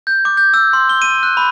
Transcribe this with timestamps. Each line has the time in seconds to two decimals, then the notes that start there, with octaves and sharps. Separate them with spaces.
0.07 G6
0.25 D6
0.37 G6
0.54 E6
0.73 C6
0.89 G7
1.02 D#7
1.23 F#6
1.37 B5